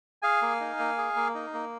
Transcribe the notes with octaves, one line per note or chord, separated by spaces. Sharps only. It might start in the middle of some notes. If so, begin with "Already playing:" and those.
G#4 F5 G#5
A#3
D#4
A#3
G#4
A#3
D#4
A#3